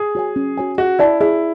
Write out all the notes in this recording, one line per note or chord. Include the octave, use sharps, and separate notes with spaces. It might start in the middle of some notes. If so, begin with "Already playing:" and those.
Already playing: G#4
F#4 C#5 G#5
C#4
F#4 C#5 G#5
F#4 G#4
E4 D5 A5
E4 G#4